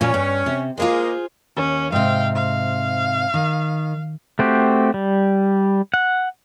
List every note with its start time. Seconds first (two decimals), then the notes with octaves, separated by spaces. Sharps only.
0.01 A#2 F3 C#4
0.14 G2
0.46 C3
0.78 G#3 A#3 F4 G#4 C5
1.56 D#2 C#4
1.92 G#2 C3 F5 G5
2.35 F5
3.34 D#3
4.39 A3 C4 F#4 G4
4.94 G3
5.94 F#5